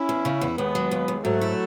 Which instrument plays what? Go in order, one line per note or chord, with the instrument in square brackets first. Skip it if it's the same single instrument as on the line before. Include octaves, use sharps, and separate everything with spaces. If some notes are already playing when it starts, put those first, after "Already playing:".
Already playing: [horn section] C#4 E4
[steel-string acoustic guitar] E2
C#3
E2
[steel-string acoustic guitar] D#2 [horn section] G#3 B3
[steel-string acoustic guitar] F#3
D#2
D#2
[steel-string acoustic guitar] G#2 [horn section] F#3 A3
[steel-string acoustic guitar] E4